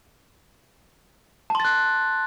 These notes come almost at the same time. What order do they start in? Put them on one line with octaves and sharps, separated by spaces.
A5 C6 A6 F#6